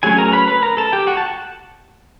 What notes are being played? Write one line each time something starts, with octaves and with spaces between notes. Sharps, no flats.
F#3 A3 C#4 G#4 G#5
A#4 A#5
A#5
B4 B5
B4 B5
A#4 A#5
A4 A5
G4 G5
F#4 F#5
A5